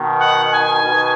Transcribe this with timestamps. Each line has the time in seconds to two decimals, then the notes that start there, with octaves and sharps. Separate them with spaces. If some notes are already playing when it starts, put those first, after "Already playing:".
Already playing: B2 D#3
0.19 F#5
0.52 G#5
0.83 B2 D#3